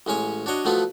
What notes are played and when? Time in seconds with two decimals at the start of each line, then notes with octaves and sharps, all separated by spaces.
0.06 A1 G#3 C#4 C#5
0.46 D4 F#4 C#5 D#5
0.65 F3 F#3 A3 B3 F4 B4